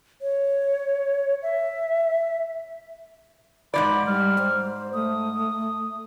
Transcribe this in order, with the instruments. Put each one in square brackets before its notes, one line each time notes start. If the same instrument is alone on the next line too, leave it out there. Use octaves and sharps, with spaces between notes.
[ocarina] C#5
E5
[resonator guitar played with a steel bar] G#2 D#3 D5 [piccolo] B5
[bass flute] G3 [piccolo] F6
[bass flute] C5
[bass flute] A3 [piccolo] D#6